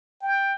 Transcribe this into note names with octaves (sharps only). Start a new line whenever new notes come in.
G5